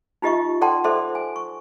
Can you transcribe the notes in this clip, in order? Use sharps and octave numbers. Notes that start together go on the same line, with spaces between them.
D#4 F4 G4 D#5 E5 C#6
A4 D5 F#5 G5 A5 C6
A4 C5 D5 E5 C6 D6
G#5
C#6